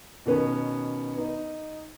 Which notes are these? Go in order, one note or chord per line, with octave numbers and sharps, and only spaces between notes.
B2 D#3 B3 C#4
D#4